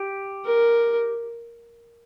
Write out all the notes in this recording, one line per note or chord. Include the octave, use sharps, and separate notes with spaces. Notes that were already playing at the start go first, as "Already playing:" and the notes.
Already playing: G4
A#4